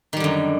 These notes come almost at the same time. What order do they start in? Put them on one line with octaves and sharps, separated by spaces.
D#3 G3 D3 F#2